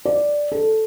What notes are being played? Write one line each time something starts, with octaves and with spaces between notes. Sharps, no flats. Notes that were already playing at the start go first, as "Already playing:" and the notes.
D5
A4